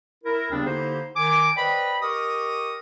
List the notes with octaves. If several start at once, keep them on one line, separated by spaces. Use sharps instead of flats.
E4 A#4
D#2 C#3 G3 B3 C4 D4
D3 A#3 D#4 E4 G4 C5
D#3 G#5 D6
B4 C5 D5 D#5 G5 B5
G4 A#4 D#5 C#6 D#6